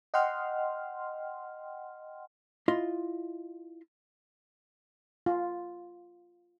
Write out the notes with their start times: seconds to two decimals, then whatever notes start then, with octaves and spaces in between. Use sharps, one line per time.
0.14 D#5 F#5 G5 C6 F6
2.68 E4 F4 D#5 C6
5.26 F4